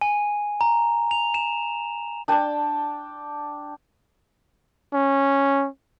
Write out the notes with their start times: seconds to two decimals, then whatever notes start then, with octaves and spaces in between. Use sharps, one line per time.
0.01 G#5
0.61 A#5
1.11 F7
1.34 E7
2.28 D4 G5 A5
4.94 C#4